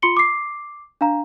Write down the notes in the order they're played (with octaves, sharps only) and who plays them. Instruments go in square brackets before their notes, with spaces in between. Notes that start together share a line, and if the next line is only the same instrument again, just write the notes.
[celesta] F4 C6 C#7 G7
D6 C7
D4 F5 A#5